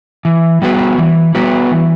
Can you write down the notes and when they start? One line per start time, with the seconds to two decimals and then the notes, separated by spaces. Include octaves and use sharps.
0.25 E3
0.62 G3 B3 F#4 B4
0.98 E3
1.35 G3 B3 F#4 B4
1.71 E3